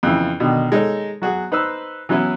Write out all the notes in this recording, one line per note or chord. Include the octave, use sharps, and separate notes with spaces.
F2 C#3 E3
B2 D3 D#3
G#3 D#4 A4 C#5
F#3 F#4 G#4
D#4 B4 C5 E6
E3 F#3 B3 C#4 E4